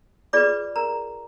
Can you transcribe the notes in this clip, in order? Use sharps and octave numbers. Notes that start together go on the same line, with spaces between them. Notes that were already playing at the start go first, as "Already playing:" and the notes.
F4 G#4 B4 D5 D6
A#4 A#5